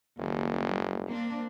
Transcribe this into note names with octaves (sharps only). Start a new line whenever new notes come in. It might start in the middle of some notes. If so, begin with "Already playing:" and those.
F#1 D#2 G3
A#3 C4 D4